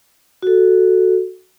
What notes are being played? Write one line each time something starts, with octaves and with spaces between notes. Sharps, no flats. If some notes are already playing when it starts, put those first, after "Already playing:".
F#4 A4